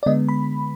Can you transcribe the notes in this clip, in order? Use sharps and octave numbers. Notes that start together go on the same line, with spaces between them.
D5
D3 G#3 B3 D#5
B5